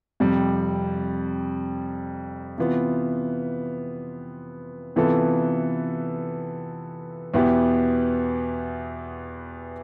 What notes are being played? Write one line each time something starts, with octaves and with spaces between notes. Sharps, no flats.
F2 C3 G3
C3 E3 B3 F4
C3 E3 B3 F4 A4
E2 B2 B3 E4 G4